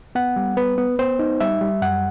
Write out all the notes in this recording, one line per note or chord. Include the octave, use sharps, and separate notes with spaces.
B3 F#5
G3
B3 B4
B3
B3 C5
D#4
G3 E5
G3
F#2 F#5